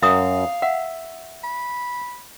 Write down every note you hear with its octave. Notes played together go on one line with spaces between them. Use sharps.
F#2 E5 F5 A#5 D#6
E5 F#5
B5